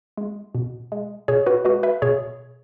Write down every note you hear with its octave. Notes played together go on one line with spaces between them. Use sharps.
G#3
B2
G#3
B2 G#4 C#5
F#4 B4
G#3 F#4 B4
B4 E5
B2 G#4 C#5